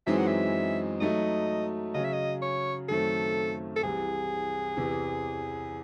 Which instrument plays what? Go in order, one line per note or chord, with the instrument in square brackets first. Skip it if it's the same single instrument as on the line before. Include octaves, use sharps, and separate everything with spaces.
[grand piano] F#2 E3 G#3 C4 D#4 [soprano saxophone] E5
[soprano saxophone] F#5
E5
[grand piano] F#3 A3 D#4 [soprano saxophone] D#5
[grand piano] C#3 F#3 C#4 [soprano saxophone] D#5
[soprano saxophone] E5
D#5
C#5
[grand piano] F#2 D#3 A3 C4 [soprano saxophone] A4
[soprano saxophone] A4
[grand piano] C2 C3 E3 [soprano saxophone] G#4
[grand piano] E2 C3 E3